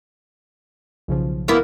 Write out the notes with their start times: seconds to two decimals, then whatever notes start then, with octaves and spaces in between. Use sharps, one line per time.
1.08 B1 C#3 F3
1.48 A#3 B3 E4